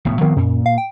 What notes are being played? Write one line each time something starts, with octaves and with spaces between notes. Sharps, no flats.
E1 A2 B3
D#3 F3 B3 C4
F#2 A#2
F5
G5